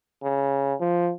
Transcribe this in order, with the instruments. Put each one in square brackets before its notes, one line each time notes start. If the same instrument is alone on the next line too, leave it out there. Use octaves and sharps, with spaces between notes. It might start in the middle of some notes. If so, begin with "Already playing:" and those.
[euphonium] C#3
F3